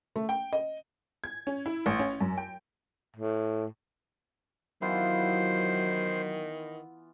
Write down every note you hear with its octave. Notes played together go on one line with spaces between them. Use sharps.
A3
G5
D#5
G#6
C#4
E4
A1
C#4
F#2
G5
A2
D#3 E3 F#3 B3 F4 C5